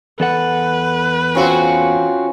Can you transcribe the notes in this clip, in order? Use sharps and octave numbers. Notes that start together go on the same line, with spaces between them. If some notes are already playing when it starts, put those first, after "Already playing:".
E2 A4 B4 F#5
C4 C#4 F4 F#4 C5